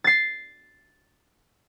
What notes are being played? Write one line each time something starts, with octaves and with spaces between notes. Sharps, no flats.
A6 C7